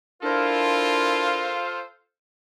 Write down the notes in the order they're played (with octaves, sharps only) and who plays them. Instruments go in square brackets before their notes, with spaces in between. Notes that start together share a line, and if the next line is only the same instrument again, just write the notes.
[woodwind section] D4 E4 A#4 [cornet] F4 [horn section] A4 C5 F5